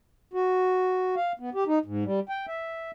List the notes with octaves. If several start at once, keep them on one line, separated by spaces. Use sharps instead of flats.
F#4
F5
B3
G4
D#4
G#2
G3
G5
E5